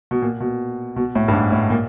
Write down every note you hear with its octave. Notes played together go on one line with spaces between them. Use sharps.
B2
A#2
B2
B2
A2
G2
G#2
A2
A#2